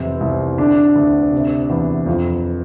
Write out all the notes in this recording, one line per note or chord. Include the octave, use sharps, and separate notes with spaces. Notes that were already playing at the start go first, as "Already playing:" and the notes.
Already playing: F1 E2 C3 C4
C2
D3 D4
D2
C3
E2
F2